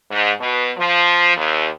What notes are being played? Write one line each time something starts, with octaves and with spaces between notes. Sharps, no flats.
G#2
B2
F3
D#2